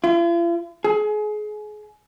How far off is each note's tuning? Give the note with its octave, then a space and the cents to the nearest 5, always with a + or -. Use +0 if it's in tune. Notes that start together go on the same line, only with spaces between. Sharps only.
F4 -45
G#4 +30